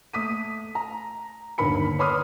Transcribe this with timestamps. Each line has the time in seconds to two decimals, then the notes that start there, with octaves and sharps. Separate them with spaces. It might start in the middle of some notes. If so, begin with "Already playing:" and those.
0.13 A3 D#6 B6 D#7
0.75 A#5
1.58 G1 D#2 D3 A#4 B5 C#7
1.99 B4 C#5 B5 C6 D#6 F6